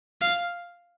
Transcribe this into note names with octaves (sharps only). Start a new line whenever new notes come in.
F5